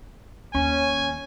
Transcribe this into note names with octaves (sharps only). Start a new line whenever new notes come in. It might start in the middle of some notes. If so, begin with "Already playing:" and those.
D#2 C#4 G#5